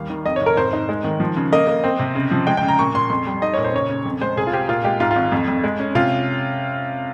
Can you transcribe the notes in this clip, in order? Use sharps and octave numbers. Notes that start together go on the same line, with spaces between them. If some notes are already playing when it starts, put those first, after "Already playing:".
Already playing: D#2 G3 F5
D#3
F2 D#5
C#5
F1
A#4
G#2 C5
D#4
G#3
D#3
F3
C#3
A#3 D#5
A#3
C4
C3
C#3
F3
G#3 G5
G5
C#3
A#5
A#2 C#6
A#2 C6
F2 C6
G3
D#4 D#5
A#2 C#5
C5
C#3 C#5
C#3
F2
G#3 C5
C2 G#4
F4
C4 G4
A#2 F4
G#3 G4
G#2 F4
F4
G#1
F2
F2
G#3
C#4
C3 F4